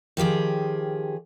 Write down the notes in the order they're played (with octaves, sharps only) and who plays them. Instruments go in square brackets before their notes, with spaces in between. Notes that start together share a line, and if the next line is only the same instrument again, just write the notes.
[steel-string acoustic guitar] D#3 F3 G4 G#4